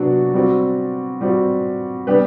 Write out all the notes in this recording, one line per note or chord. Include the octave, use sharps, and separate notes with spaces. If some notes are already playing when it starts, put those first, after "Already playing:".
Already playing: C3 F#3 B3 D4 F#4
G3 C4 F#4
G3 C4 F#4
G3 B3 D4 G4 B4